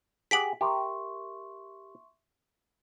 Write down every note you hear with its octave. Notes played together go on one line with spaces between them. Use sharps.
G4 G#4 F#5 B6 D7 F#7
G4 A#4 E5 C6 C#6